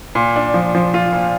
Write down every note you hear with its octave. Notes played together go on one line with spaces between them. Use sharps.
A#2
D4
F3
F3
F4
A#2